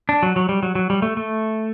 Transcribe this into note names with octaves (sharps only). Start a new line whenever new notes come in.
D4
F#3
F#3
G3
F#3
F#3
G3
A3
A3